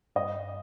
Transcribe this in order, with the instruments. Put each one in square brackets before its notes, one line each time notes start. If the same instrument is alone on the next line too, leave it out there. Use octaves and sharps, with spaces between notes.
[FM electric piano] G2 [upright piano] D#5